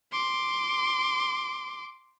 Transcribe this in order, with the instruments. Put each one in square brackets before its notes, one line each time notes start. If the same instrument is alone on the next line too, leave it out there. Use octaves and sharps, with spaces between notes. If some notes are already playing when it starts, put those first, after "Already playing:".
[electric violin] C6 D6